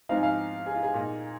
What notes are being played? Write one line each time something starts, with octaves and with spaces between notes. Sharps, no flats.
G#2 F3 C4 D#4 F5
G#5
F5
G#4
F4
G#4
A#2 A#3 D#4